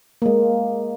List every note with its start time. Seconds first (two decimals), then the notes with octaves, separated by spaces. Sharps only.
0.22 G#3 A#3